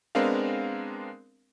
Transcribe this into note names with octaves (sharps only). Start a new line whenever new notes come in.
G#3 B3 C4 D4 A#4 F5